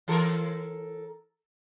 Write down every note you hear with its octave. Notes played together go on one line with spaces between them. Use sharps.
E3 A4 A#4